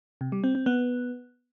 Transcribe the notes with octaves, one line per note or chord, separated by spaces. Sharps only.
C3
G3
C4
C4
B3